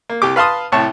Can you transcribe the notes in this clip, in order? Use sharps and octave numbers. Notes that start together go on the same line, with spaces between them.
A#3
C2 G4 D6
B4 F5 A5 C6 D#6
C2 A2 C#5 A5